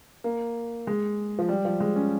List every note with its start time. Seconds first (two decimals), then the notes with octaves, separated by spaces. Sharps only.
0.24 A#3
0.87 G#3
1.39 F3
1.49 G3
1.65 F3
1.80 G#3
1.96 C#4